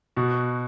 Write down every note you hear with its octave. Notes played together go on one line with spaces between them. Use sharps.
B2 F#4